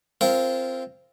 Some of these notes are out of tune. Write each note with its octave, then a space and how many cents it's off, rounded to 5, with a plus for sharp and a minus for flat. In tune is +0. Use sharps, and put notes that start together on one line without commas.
C4 +0 F4 -20 A#4 -15